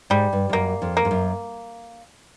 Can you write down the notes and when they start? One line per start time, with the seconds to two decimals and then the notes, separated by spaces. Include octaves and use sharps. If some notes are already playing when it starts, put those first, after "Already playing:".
0.10 G#2 G3
0.33 G2
0.49 F2
0.53 F#2 A#3
0.82 F2
0.97 A#3
1.05 F2
1.11 F#2